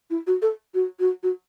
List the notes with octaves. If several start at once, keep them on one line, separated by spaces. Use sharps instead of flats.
E4
F#4
A4
F#4
F#4
F#4